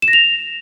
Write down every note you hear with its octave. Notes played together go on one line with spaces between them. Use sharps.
E7
A#6
F7